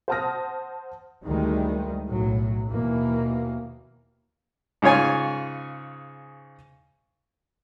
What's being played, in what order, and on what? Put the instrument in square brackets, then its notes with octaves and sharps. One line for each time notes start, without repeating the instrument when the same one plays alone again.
[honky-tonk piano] C5 F#5 A5 D#6 F6 A#6
[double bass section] D2 D#3 G3 G#3
B1 A2 F#3
D#2 B2 E3 A#3
[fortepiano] G#2 C#3 F4 C#5 G#5